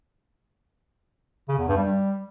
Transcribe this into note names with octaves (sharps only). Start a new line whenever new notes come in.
C#3
E2
G2
G3